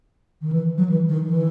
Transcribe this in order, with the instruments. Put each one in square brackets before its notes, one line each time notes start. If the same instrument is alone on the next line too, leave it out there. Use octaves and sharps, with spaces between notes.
[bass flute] D#3
E3
F#3
E3
D#3
E3